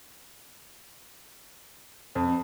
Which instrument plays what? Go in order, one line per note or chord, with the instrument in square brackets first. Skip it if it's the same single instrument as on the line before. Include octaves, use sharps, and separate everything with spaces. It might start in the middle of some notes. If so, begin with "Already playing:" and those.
[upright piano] F2